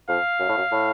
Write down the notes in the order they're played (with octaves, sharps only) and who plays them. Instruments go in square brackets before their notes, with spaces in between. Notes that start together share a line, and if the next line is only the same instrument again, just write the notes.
[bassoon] F2 [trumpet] F5
[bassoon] F#2
A2
F#2
A2